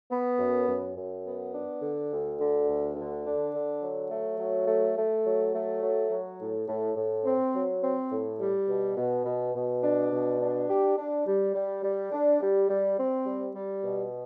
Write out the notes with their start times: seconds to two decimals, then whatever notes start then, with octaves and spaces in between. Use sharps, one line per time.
0.10 B3
0.38 F#2
0.68 F#2
0.95 F#2
1.25 B3
1.54 D4
1.82 D3
2.11 D2
2.39 D3
2.67 D2
2.96 D3
3.26 D4
3.54 D3
3.82 F#3
4.11 A3
4.39 F#3
4.67 A3
4.97 A3
5.26 F#3
5.54 A3
5.83 F#3
6.11 F#3
6.40 A2
6.68 A2
6.96 A2
7.25 C4
7.54 F#3
7.83 C4
8.11 A2
8.40 G3
8.68 B2
8.97 B2
9.25 B2
9.54 B2
9.83 D4
10.12 B2
10.41 D4
10.69 G4
10.98 D4
11.27 G3
11.55 G3
11.83 G3
12.12 D4
12.41 G3
12.69 G3
12.98 C4
13.26 G3
13.55 G3
13.84 B2